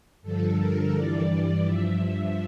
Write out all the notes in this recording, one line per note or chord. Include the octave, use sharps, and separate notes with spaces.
G2 D3 F3 A4
A#4
G2 E3 G3 D5
G2 F3 E5